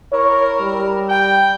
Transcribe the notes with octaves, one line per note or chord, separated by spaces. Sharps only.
E4 A#4 C#5
G3
G5